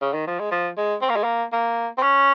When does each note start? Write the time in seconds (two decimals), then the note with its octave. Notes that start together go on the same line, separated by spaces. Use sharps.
0.02 C#3
0.14 D#3
0.27 F3
0.40 G#3
0.51 F3
0.77 G#3
1.02 C4
1.10 A#3
1.16 G#3
1.24 A#3
1.53 A#3
1.98 C4
2.03 C#4